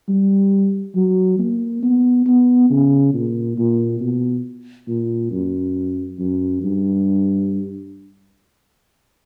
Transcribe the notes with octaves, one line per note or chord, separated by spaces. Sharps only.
G3
F#3
A#3
B3
B3
C#3
A#2
A#2
B2
A#2
F#2
F#2
G2